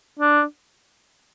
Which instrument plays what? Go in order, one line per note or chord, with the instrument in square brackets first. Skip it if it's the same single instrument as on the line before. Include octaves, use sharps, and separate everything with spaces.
[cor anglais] D4